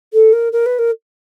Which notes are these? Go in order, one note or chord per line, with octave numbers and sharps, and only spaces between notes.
A4
A#4
A#4
B4
A#4